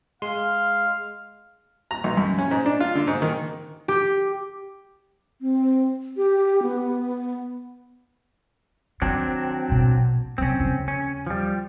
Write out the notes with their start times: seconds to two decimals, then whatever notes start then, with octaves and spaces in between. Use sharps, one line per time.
0.22 G#3 F5 C6
1.91 A#5
2.04 B1
2.17 F#2
2.38 C#4
2.51 G#2
2.66 D4
2.80 F4
2.95 D3
3.08 G#2
3.22 D#3
3.88 G4
5.41 C4
6.17 G4
6.62 B3
9.02 D#3 F#3 C4 D4
9.69 A#1 B2
10.38 C3 F#3 C4 C#4
10.59 D#2 C#3
10.88 C#4
11.27 F3 G3